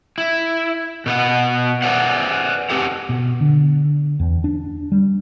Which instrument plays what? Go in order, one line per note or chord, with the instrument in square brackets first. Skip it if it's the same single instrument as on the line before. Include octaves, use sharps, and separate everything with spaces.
[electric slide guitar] E4
B2 B4 F#5
B4 C5 D5 E5 F#5
C4 G4 A4 F#5
[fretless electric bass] B2
D3
E2
D4
G3